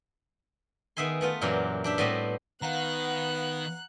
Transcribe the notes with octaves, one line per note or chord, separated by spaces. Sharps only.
D#3 B3 G#4 E5 G#5 C6
A3 B3 F4
F#2 A#2 E3 F#3 G4
D4 G4 E5
A2 G3 B3 C4 D#5 B5
D#3 B3 F5 F#5 A#5 F#6